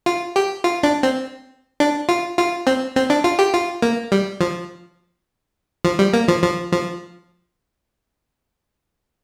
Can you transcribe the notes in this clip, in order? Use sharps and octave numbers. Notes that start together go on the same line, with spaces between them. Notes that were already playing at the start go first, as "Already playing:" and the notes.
F4
G4
F4
D4
C4
D4
F4
F4
C4
C4
D4
F4
G4
F4
A#3
G3
F3
F3
G3
A#3
F3
F3
F3